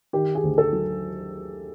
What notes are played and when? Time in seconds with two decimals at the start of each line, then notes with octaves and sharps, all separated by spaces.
0.13 D#3 G4
0.35 G#4
0.43 D2
0.58 A4
0.73 F#3